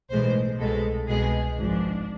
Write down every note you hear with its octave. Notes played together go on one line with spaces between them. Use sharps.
B1 A2 E3 G#3 C5
C2 B2 G#3 A4
C2 B2 G#3 G#4
G#1 G#2 F3 D4